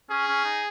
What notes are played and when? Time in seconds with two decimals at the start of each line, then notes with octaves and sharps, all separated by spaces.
0.10 C#4 G#4
0.28 C#4
0.44 D#4